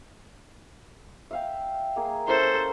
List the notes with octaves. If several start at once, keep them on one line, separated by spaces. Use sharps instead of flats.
E5 F5 G5
A#3 G#4
C#4 E4 A4 A#4 C5